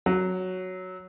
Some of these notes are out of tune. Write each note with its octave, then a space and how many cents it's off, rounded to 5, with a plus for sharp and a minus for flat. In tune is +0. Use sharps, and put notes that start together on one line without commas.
F#3 +0